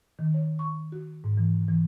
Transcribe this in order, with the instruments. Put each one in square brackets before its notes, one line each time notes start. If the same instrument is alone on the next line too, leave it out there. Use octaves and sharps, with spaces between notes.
[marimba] D#3
C#5
C#6
F#4
G#2
E3
E3